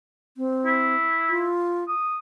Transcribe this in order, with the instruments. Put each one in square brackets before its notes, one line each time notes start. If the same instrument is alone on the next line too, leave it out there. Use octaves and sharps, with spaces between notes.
[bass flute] C4
[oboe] E4
[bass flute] F4
[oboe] D#6